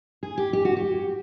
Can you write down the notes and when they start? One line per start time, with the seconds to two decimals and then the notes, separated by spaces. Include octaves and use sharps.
0.23 G#4
0.37 G4
0.53 G4
0.65 F#4
0.76 G4